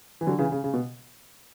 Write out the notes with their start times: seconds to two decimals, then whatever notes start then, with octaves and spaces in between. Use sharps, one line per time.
0.21 E3
0.27 D3 F#3
0.39 C#3 E3
0.52 C#3
0.64 C#3
0.74 B2